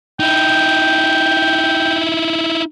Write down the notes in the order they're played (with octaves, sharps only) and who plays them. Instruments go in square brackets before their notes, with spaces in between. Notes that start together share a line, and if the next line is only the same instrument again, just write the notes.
[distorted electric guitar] D#4 E4 [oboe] G5